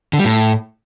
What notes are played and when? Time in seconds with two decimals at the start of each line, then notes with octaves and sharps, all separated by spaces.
0.13 D3
0.19 G3
0.24 A2